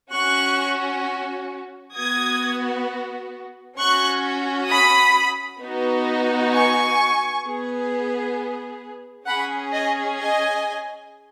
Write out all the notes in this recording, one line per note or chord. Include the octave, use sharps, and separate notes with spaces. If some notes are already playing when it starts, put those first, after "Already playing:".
C#4 F#4 C#6 F#6
B3 F#4 D#6 G#6
C#4 F#4 C#6 F#6
B5 D#6
B3 D#4 F#4
G#5 C#6
B3 G#4
C#4 G#4 F#5 B5
D#5 G#5
D#5 G#5